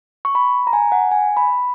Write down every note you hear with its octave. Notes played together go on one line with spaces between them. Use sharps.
C#6
B5
A#5
G#5
F#5
G#5
B5